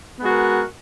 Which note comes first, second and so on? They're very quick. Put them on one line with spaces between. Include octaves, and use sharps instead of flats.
B3 G#3 F#4 A#4